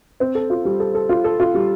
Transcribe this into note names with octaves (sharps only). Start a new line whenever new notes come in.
C4
A4
F4
G3
A4
A4
F4
A4
F4
G3